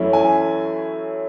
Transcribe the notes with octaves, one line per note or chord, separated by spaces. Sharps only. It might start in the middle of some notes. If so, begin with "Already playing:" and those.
Already playing: F#2 E3 A3 C#4 E4
G#5